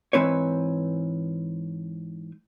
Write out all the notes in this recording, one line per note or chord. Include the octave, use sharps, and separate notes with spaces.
G#2 E3 C4 B4 C#5